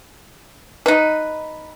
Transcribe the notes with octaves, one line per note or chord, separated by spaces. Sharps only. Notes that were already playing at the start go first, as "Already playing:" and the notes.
D#4 B4